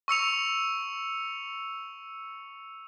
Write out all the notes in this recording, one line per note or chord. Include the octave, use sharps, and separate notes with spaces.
C#6 E6 C#7 F7